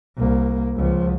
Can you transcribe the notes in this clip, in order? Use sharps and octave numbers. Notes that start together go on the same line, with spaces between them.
C2 A#3
C#2 F3